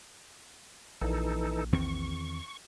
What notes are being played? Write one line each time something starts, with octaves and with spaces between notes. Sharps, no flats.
A#1 E3 D#4 A4
E2 D#3 C4 C#6